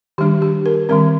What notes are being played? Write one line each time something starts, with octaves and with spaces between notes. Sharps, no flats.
D#3 G3 D4 G4
G4
A#4
D#3 G3 C4 A#4